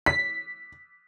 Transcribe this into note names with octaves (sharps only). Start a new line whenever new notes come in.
B6